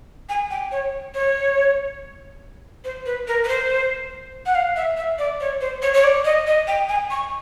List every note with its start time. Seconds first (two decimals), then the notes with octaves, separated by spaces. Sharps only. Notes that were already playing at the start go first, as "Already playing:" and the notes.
0.29 G#5
0.50 G5
0.72 C#5
1.14 C#5
2.84 C5
3.06 B4
3.28 A#4
3.44 B4
3.48 C5
4.46 F#5
4.55 F5
4.76 E5
4.97 E5
5.19 D5
5.40 C#5
5.61 C5
5.82 C#5
5.94 C#5
6.04 D5
6.25 D#5
6.47 D#5
6.68 G5
6.89 G#5
7.11 C#6